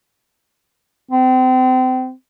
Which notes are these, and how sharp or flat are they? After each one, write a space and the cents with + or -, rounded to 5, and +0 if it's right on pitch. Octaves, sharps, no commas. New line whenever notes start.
C4 -30